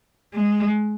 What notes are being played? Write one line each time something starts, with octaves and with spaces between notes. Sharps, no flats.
G#3